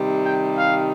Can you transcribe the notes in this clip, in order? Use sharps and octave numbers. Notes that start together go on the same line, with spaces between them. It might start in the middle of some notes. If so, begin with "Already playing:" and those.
Already playing: C3 D#3 G3
G5
F5